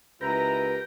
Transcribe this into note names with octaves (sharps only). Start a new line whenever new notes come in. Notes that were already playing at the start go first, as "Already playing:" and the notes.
C#2 E4 G4 A#4 B4 A#5